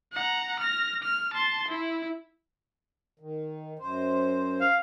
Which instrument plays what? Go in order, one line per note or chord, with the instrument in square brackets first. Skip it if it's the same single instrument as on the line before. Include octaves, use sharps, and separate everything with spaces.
[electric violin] F#5 A#5
F6 A#6
F6
A5 C6
E4
[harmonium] D#3
F#2 C5
[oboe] F5